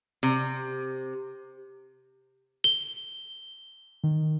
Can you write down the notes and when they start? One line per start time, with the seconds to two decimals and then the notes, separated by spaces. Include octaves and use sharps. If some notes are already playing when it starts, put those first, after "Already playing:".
0.23 C3
2.64 G7
4.04 D#3